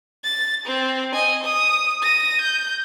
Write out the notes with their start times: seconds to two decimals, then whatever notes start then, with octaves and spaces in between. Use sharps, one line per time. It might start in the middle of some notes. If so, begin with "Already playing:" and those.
0.24 A6
0.66 C4
1.13 D#5 G#5
1.44 D#6
2.02 A#6 D#7
2.41 G6